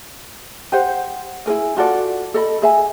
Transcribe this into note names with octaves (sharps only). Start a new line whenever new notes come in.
G4 C5 F#5
E4 G#4 A#4 G#5
F4 F#4 A4 D5
A4 D#5 B5
G#4 E5 G#5